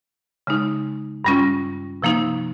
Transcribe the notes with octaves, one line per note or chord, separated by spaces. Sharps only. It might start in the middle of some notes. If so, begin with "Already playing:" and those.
C#3 G#3 D#4
G2 G3 C#4 F4
C3 F3 A#3 D#4